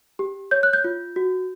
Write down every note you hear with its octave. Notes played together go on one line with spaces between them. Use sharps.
G4
C#5 G6
F#6
G6
F4
F#4